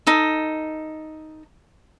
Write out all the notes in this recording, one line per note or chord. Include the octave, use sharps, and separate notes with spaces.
D#4 A4